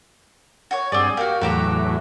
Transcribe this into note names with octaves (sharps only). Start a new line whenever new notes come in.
F#4 C#5
G2 C4 G#4 D5 D#6
A#3 F#4 G4
E2 A2 F#3 F#4 G4 A#5